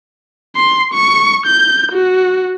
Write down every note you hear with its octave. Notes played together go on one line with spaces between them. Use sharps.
C6
C#6
G6
F#4